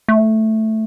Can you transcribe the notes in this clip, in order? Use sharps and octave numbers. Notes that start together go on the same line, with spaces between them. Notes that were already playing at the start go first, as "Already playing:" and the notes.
A3